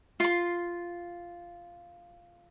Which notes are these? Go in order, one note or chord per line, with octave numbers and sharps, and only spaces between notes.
F4 C6